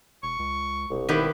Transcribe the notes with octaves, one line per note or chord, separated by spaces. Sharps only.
E1 C#6
C#2
E1 C2
D#3 B3 E4 G4